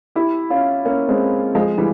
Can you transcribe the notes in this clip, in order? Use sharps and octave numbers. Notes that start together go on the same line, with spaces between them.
E4 G4
C#4 F4
A#3 C#4
G#3 C4
F3 G#3
E3 G3